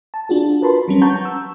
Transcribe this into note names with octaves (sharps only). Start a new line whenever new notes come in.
A5
D4 F4 F#4 G#4
A#4 B4 A5 B5 C6
F#3 G3 C#4
F#5 A5 A#5 C#6 G6
E6